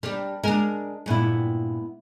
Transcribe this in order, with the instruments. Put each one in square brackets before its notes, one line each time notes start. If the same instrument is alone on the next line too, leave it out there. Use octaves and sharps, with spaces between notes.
[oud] G3 D4 [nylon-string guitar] A#4
[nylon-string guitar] G#3 [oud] D4 A#4
[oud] G2 A#2 [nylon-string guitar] G#3 B3 E4